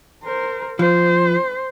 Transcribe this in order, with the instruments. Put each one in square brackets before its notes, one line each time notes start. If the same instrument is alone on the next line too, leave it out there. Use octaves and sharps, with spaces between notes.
[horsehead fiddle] A#4 C5
[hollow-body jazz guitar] F3 [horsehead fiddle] C5